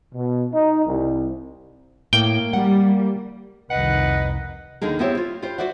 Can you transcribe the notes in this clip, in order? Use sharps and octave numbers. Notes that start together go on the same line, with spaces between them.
B2
D#4
C2
A2 A#3 G5
G3 F#5
C2 F2 D#3 B4 D#5 F#5
D#2 D3 D#4 G#4 A#4
B3 C4 E4 G4 C5 C#5
F4
F4 G4 B4 C5
F#4 C5 D5 E5 F#5